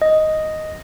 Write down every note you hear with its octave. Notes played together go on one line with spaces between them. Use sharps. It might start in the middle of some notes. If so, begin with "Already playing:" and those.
D#5